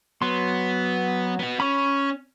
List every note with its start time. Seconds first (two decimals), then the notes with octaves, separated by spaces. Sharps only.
0.22 F#3 B3 C6
1.39 B3 F#4
1.60 C#4 B5 C#6